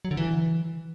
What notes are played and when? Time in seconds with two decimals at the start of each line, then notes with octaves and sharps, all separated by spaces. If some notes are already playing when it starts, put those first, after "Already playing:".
0.05 F#3
0.11 D3
0.17 E3